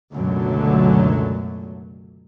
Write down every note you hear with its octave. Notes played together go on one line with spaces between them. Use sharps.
C#2 F#2 B2 D3 F#3 A3